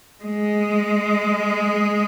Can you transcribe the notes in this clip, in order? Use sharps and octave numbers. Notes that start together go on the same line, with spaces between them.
G#3